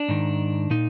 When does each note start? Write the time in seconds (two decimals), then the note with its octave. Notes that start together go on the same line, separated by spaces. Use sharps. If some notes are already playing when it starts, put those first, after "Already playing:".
Already playing: D4
0.09 G#2 D#3
0.70 A#2 D#4